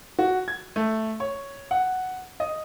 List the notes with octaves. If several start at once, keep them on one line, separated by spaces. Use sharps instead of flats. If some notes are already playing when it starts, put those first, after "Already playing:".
F#4
G#6
A3
C#5
F#5
D#5